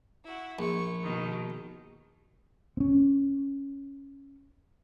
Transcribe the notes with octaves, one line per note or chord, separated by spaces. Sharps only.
E4 F#4
A#1 C#6
B2 D#3
C4 C#4